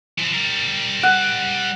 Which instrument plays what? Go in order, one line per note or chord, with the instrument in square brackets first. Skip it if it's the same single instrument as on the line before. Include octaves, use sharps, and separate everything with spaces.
[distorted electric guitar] E3 F3
G3 A#4
[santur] F#5